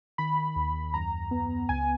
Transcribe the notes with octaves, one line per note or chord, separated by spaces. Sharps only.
D#3 B5
D#2
F#2 A#5
B3
C#2 G#5